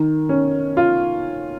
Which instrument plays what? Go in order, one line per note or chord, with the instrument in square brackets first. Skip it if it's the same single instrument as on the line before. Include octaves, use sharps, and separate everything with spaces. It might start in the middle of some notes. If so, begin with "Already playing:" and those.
Already playing: [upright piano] D#3
C#4
F4